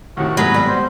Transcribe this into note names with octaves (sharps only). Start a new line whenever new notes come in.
D#2 A2 C3 F#4
G#1 A2 F#3 G#3 B3 B4
G3
B3 C5